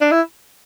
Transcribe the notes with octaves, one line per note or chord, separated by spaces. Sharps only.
D4
E4